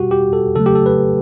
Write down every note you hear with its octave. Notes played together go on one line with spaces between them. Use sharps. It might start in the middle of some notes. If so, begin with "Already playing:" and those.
Already playing: B2 G3 F#4 G4
G4
A4
C#3 F#3 A3 A4
G4
A4
B4